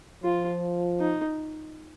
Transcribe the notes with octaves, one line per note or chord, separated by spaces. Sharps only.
F3 F4
D#4